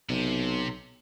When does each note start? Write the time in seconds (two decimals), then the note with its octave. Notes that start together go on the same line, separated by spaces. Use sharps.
0.09 B1 C3